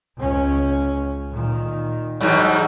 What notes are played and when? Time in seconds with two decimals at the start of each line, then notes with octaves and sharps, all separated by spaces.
0.18 C#2 C#4
1.30 A#2 D#3
2.21 G#2 E3 F#3 G3 D#4